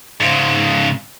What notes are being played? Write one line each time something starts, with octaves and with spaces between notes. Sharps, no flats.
G#2 C#3